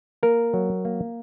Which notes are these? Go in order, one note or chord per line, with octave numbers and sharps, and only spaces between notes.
A#3 A#4
F#3
A#3